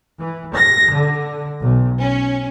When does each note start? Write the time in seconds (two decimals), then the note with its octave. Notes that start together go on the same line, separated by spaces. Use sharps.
0.20 E3
0.55 A#6
0.94 D3
1.59 B1
2.01 C#4